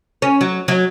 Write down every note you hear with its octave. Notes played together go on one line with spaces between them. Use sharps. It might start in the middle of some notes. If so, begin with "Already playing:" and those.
C#4
F#3
F#3